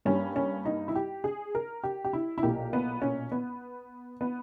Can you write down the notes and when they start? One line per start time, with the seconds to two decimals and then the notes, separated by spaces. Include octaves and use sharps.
0.05 G2 G3 A#3 C#4
0.36 C#4
0.65 D#4
0.88 E4
0.95 G4
1.24 G#4
1.55 A#4
1.83 G4
2.04 G4
2.13 E4
2.38 E4
2.43 B1 A#2 A#3 G4
2.73 B3
3.02 C#4
3.32 B3
4.21 B3